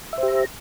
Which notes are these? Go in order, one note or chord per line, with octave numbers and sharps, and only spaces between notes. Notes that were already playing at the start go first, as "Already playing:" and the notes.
G4 C5 E5 A#5